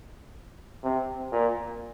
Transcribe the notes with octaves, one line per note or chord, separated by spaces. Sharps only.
C3
A#2